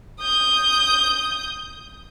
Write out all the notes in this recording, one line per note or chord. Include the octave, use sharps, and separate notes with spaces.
D#6 G6